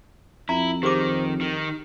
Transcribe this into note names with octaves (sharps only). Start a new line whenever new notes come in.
F2 E4 A#5
D#3 G4 G#4 C5 D6
D#3 D#4